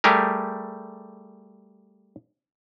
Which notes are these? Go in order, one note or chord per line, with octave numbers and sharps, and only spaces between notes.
G3 A3 G4 G#4 A#4